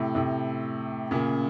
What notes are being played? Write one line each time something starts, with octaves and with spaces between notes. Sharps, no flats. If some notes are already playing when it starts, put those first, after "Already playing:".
Already playing: A2 C3
A2 C3
A#2 C#3